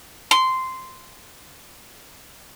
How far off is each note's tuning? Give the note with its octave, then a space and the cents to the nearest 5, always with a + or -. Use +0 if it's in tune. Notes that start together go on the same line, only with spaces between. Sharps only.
C6 -10